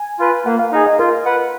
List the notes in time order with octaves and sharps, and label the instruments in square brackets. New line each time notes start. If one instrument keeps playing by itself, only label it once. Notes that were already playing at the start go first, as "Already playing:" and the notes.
Already playing: [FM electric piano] G#5
[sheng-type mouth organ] F4 B4
[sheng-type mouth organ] A#3 [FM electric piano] F#5
[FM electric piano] F5
[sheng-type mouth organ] D#4 G#4 [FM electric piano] D#5
[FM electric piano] D#5
[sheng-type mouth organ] F4 [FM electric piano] A#4
[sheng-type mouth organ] B4 F#5